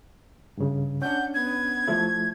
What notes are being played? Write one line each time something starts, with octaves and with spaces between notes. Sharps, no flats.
G2 C#3
C#4 D4 F#5 G6
B3 G#6
F3 A3 E4